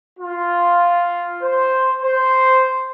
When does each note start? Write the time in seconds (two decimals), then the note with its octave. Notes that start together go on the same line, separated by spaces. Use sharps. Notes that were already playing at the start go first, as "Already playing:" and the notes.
0.19 F4
1.41 C5
2.02 C5